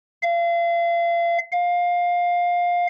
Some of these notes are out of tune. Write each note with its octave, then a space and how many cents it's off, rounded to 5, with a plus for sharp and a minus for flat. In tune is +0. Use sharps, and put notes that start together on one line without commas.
F5 -35
F5 +15